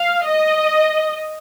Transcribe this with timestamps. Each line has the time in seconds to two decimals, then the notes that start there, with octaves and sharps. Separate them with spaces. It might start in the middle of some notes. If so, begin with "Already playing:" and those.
Already playing: F5
0.24 D#5